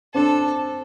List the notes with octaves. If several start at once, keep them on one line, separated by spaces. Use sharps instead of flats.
C4 D4 A4